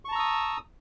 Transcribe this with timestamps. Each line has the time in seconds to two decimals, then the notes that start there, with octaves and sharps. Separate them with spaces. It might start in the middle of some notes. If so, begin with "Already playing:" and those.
0.05 C#6
0.09 A5
0.12 A#5
0.16 E6
0.19 D#6